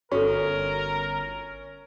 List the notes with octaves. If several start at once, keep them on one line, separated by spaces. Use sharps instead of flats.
G1 C#4 F#4 A4 A#4